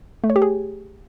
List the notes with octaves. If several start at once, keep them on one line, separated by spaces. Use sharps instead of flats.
A3
C#5
G4
G#4